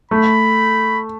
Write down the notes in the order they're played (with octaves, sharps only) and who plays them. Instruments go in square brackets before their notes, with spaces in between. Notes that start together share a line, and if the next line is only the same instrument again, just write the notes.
[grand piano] A3 [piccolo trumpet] B5